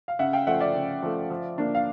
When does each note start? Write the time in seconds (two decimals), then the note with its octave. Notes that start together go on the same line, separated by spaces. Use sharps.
0.08 F5
0.19 C#3 E5 F#5
0.33 F5 G5
0.47 F3 A3 E5 F#5
0.60 D5 E5
0.75 C#3
1.03 F3 A3
1.30 F3
1.58 A#3 D4
1.75 F5